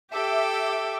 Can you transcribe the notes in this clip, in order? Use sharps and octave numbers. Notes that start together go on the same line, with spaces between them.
G4 A4 E5 G5 D6